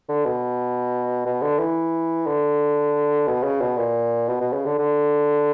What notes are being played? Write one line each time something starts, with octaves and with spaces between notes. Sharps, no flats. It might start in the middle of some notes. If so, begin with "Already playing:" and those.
D3
B2
B2
D3
E3
D3
B2
C#3
B2
A#2
B2
B2
C#3
D3
D3